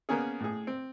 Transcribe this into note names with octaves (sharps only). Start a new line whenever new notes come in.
A#3 B3 C#4 G#4
A2 G#4
C4